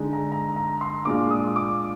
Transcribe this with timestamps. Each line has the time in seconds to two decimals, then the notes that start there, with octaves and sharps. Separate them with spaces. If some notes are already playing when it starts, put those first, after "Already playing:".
Already playing: D3 G#3 D#4
0.13 A#5
0.32 A#5
0.56 A#5
0.81 C6
1.05 A#2 G#3 D4 F4 D6
1.30 D#6
1.56 D6